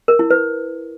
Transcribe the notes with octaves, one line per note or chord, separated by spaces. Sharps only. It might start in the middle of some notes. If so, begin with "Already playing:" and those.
A#4
E4
B4